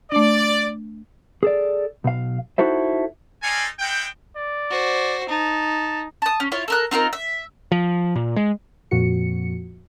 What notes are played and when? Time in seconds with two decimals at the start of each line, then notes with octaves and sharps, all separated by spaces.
0.12 A3 D4 D5
1.43 G#4 A4 D5
2.04 B1 F5
2.58 D#4 E4 F#4 A4 C5 E5
3.43 D#4 F4 A4 D5 F5 G#5
3.79 G#3 E4 F#5 G5
4.36 D5
4.70 F#4 C5
5.29 D#4 A5
6.22 A5 D#6
6.40 C#4
6.52 E4 F4 C#5
6.68 A4 A#4 F#6
6.91 C4 D#4 F4 A#4
7.13 E5
7.72 F3
8.16 A#2
8.36 G#3
8.91 F2 A#2 F3 F#4 C#7